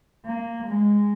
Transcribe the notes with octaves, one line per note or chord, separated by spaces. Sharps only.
A#3
G#3